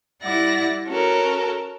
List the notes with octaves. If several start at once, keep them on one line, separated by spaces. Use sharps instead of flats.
G3 E4 D5 F#5 A#6
C#4 F#4 A4 A#4